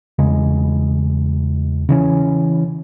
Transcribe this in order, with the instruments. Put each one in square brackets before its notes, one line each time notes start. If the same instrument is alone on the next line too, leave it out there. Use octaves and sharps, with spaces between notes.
[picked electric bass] E2 C#3 G#3
C#3 E3 C#4